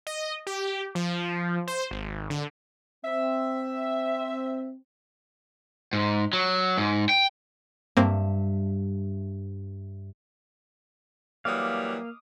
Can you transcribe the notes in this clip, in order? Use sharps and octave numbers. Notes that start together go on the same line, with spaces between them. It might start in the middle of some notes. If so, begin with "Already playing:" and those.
D#5
G4
F3
C5
G#1
D3
C4 E5
G#2
F#3
G#2
G5
G2 A#3 C4 E5
E3 F#3 G3 A#3 F5 D6 D#6